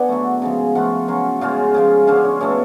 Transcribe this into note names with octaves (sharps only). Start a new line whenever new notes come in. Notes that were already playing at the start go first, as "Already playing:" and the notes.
Already playing: B3 D4 B4 D5 F#5 G#5
D3 F#3 A3
C#3 F3 G#3
F3 A3 F4 F#5
F#3 C#4 F4
C#3 G#3 C#4 F4 F5
C#3 F3 G#3
D3 G#3 C#4 F5
C#5
B2 A3 C#4 C#5